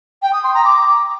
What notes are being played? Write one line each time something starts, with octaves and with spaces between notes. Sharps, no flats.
G5
D#6
C6
A#5
D6